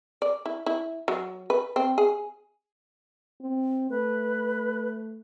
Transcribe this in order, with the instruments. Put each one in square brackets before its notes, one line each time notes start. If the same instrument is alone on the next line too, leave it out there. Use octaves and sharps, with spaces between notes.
[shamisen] D5
E4
E4
F#3
B4
C4
G#4
[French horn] C4
[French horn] A3 [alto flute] B4